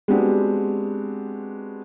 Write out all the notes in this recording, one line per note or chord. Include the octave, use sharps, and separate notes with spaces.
G#3 B3 C4 D4 F#4 G4